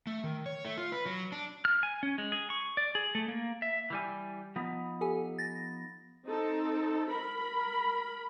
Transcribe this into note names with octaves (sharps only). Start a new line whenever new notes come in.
A3
D#3
C#5
A3
F4
B4
F#3
D4
F6
G#5
C#4
G#3
G#4
C#6
D5
G#4
A3
A#3
E5
E3 G3 G#5
F3 B3 D#4
G4 A4 G#5
A6 A#6
C4 D#4 A4
A#4 B5